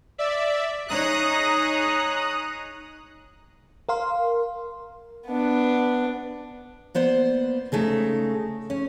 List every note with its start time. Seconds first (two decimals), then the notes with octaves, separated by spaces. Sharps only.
0.18 D5 E5
0.88 D#4 G#4 C#5 A#5 D#6 F#6
3.89 A#4 F5 C6
5.27 B3 D4
6.95 A#3 B3 C5 D5
7.72 C#3 G#3 A3 D#4
8.70 C#4